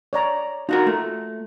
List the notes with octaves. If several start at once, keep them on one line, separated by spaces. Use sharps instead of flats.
C#5 D5 A#5
D#4 F4 F#4 A#4
A3